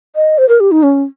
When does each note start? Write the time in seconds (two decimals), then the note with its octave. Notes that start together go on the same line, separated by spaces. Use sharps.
0.16 D#5
0.38 C5
0.49 A#4
0.60 G4
0.71 D#4
0.83 C#4